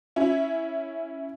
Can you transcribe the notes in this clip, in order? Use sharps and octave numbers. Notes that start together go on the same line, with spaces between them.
C#4 E4